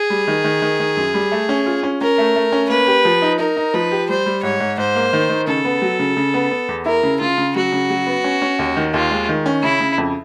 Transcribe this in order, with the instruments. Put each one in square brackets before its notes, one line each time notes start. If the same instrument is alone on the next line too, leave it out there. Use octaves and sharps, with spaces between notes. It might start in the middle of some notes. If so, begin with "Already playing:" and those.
Already playing: [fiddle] G#4
[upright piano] G3
D#3
D#3
D#3
D#3
F#2
G3
A3
C#4
F4
C#4
[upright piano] C#4 [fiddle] A#4
[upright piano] A3
A3
C#4
[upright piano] A#3 [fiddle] B4
[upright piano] G4
F3
D#4
[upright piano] D#4 [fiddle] A#4
[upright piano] D#4
[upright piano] F3 [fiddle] B4
[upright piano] G4
[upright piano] G3 [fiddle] C5
[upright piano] G3
[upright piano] G#2 [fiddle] C#5
[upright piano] G#2
[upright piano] G#2 [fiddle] C5
[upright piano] A#3
D#3
D#3
[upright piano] C#3 [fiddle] A4
[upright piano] B3
F#3
C#3
C#3
B3
B3
E2
[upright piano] E4 [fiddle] A#4
[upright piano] C#3
[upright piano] C#3 [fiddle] F4
[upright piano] C#3
[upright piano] F#3 [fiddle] F#4
[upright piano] C#3
F#3
B3
C#4
C#4
D#2
D#3
[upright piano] D#2 [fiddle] F4
[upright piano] G#3
D#3
C#4
[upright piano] C#3 [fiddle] E4
[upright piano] C#3
F2